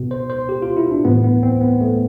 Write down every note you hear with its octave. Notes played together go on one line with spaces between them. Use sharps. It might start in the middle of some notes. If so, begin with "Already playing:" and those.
Already playing: B2
C5
C5
G4
F4
E4
D4
A2 E3 B3
B3
C4
B3
A3